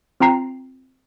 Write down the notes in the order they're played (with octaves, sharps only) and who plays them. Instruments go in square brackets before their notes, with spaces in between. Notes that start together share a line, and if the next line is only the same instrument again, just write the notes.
[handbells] C4 F4 G5 A#5 C7